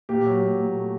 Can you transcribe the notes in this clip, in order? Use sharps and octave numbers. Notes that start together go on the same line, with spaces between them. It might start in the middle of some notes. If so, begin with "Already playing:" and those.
A#2 G4
F#3
A#2
A#2
A3